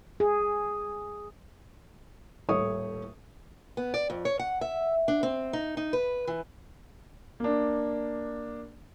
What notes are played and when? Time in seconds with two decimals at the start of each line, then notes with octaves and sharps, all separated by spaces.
0.20 G#4
2.49 D#1 A2 A3 C#5 C#6 D#6
3.77 B3
3.94 D5
4.10 F2
4.25 C#5
4.39 F#5
4.61 E5
5.08 D4
5.23 C4
5.53 D#4
5.77 D#4
5.93 B4
6.27 E3
7.40 A#3 D4